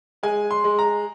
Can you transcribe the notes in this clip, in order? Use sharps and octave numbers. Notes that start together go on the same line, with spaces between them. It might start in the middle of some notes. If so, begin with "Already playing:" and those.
G#3 G#5
C6
G#3
A#5